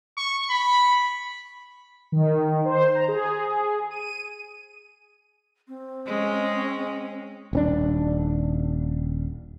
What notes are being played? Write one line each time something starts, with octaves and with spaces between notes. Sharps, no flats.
C#6
B5
D#3
C5
A#5
G#4
D#7
C4
G#3 C#4
D#1 C4 D4